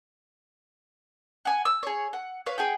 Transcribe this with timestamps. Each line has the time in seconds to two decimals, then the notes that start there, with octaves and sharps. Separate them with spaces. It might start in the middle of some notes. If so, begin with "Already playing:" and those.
1.45 F#5 G#5
1.65 E6
1.83 G#4 C#5
2.13 F#5
2.46 B4 C#5 F5
2.58 G#4 F#5 G5